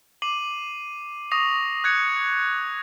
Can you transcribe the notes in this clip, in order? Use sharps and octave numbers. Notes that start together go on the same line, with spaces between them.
D6 C7 D#7 F#7
C#6 D#6 A#6 C7 F7
F#6 G#6 C#7